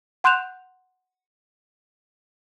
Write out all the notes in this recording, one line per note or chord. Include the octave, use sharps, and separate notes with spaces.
F#5 C6 F#6 G6 E7 F7